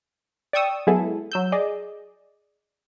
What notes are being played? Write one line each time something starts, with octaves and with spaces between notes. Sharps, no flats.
D5 G5 C#6 D#6 E6
F#3 G#3 B3 E4 G#4 A4
F#3 E6 G6
G#4 D5 D#5